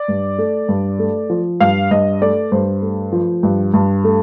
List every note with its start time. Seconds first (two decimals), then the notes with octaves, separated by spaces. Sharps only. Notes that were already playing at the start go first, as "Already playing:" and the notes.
Already playing: D5
0.08 G2
0.38 A3
0.69 G2
0.99 A3
1.30 F3
1.60 G2 F5
1.91 G2 D#5
2.22 A3 D5
2.52 G2 C5
2.82 A3
3.12 F3
3.43 G2
3.74 G2
4.04 A3